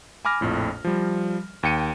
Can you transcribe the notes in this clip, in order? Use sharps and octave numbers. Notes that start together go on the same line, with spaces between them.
G#5 B5 D6 F6 A#6
A#1 F2 A2
F3 G3
D#2 G5 C#7 D#7